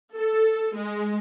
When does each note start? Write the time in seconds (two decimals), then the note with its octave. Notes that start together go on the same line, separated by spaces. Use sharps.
0.15 A4
0.75 G#3